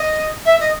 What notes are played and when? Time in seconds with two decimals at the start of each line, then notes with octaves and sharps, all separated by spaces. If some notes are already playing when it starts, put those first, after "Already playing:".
Already playing: D#5
0.45 E5
0.60 D#5